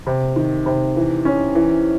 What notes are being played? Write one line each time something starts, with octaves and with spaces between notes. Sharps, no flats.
C3
D#3
C3
E3
C#4
E3